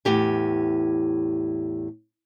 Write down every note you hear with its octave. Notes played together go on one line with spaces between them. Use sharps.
E2 A2 G4 G#5